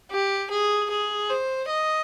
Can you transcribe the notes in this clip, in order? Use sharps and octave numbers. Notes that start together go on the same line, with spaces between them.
G4
G#4
G#4
C5
D#5